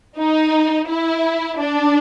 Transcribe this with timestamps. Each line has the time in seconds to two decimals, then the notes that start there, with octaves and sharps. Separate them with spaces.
0.17 D#4
0.88 E4
1.58 D4